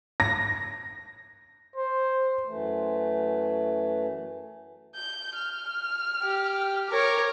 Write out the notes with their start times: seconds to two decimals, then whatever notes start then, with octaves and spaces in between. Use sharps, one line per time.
0.20 A#6
1.76 C5
2.45 F#2 E3 A3
4.95 G6
5.35 F6
6.22 G4
6.90 A#4 C#5 D6